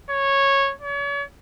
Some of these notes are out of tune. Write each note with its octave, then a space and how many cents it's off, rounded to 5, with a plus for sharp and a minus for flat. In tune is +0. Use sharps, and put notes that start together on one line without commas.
C#5 -10
C#5 +40